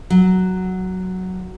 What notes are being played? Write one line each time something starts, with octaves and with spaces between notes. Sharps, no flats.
F#3